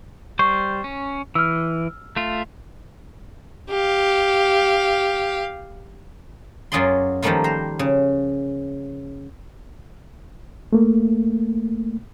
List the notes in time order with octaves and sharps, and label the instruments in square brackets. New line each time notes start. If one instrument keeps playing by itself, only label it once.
[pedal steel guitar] G3 C5 [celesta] C#6
[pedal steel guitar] C#4
[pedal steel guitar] E3 [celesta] E6 F6
[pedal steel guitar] A3 F4
[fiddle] G4 F5
[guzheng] F#2 F#3 F4 G#4 D5 C6
D#3 F3 G3 A3 A#3 F4
C5 A#5
C#3
[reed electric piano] A3 A#3